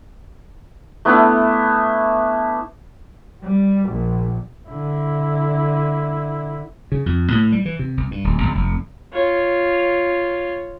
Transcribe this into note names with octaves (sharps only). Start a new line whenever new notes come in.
A3 B3 D4 E4
G3
A#1
D3 E4
C#3
F2
A2
G3
E3
C3
C2
G2
D1
G#1
F1
F4 C#5